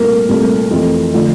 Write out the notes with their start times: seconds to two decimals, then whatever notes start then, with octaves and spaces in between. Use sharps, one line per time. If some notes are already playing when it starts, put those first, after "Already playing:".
Already playing: C2 A#2 A3 A#4
0.29 C2 A#2 A3
0.71 F2 E3 A3
1.14 D3 F3 A3